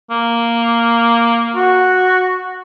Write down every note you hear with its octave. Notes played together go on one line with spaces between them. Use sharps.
A#3
F#4